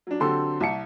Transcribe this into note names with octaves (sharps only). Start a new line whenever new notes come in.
F#3 D4
D3 F#3 C4 G4 A4 C6
C2 E5 A5 C#7